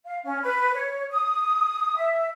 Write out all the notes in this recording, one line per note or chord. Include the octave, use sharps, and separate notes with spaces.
F5
C#4
B4
C#5
D#6
E5